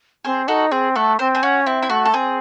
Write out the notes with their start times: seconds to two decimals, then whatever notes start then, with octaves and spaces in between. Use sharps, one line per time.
0.25 C4 G#4 C5
0.48 D#4 F#4 A4
0.72 C4 G#4
0.95 A3 F#4 A4
1.19 C4 C5
1.35 G#4 C5
1.43 C#4 F#4
1.66 C4 E4
1.82 E4
1.90 A3 F#4
2.05 A4
2.14 C4 G#4